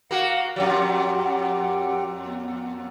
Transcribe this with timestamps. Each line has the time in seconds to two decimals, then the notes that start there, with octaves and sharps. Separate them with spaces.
0.11 A#3 F#4 F5 F#5
0.56 F2 A#2 F#3 G4 F#5 G5
2.25 B3